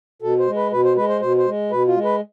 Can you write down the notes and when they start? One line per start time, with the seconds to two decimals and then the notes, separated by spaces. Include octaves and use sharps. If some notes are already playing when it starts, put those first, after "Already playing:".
0.22 B2 A4
0.39 C5
0.47 G#3
0.56 B4
0.72 B2 B4
0.84 C5
0.96 G#3 B4
1.09 C5
1.21 B2 C5
1.38 C5
1.47 G#3
1.71 B2 B4
1.87 F4
1.96 G#3
2.04 B4